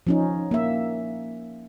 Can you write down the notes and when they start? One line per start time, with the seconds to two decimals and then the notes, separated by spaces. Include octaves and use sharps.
0.07 F3 C#4 D#4
0.51 A#3 E5